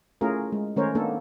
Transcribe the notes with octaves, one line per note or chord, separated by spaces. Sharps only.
A3 C#4 E4 F4 G#4 A#4
G#3
D#3 A3 C#4 A#4 C5 C#5
A#3 B3 D4 D#4 A4